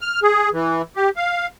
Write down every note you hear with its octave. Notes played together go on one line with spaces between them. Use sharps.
F6
G#4
E3
G4
F5